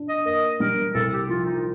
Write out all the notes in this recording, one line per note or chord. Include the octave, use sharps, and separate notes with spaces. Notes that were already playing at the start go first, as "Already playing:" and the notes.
Already playing: D4
D#5
A#3 D#5
G3 A#4
C2 A4
G4
F3 F4
D#4